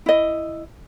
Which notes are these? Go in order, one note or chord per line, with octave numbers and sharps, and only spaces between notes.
E4 D#5